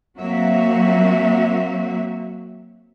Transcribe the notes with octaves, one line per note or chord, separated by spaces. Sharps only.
F#3 A#3 C4 F#4 E5